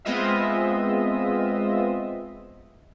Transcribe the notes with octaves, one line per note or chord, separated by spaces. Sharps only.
G#3 B3 C4 F4 D#5 E5